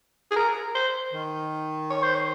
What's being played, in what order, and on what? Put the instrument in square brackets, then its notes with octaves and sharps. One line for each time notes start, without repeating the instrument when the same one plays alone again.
[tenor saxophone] G#4
A#4
C5
[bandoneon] D#3
[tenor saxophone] C#5
C5
C#5